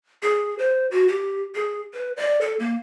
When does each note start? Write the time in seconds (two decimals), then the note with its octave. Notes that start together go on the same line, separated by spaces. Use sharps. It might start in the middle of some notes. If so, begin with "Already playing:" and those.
0.23 G#4
0.58 C5
0.91 F#4
1.08 G4
1.55 G#4
1.93 B4
2.17 D5
2.41 A4
2.60 A#3